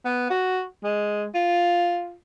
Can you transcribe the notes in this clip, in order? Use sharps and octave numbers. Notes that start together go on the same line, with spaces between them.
B3
F#4
G#3
F4